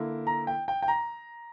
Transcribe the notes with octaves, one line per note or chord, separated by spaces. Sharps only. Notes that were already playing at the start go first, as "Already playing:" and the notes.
Already playing: D3 A#3 E4
A#5
G5
G5
G5
A#5